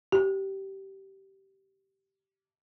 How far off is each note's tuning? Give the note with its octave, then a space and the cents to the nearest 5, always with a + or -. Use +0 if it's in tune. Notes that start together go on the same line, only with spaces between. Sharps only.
G4 -20